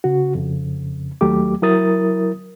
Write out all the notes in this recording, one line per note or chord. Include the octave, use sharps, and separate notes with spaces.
C#3 F#4
F2 C#3
D#2 F#3 A3 G4 D6
F#3 E4 A#4 D#6 A6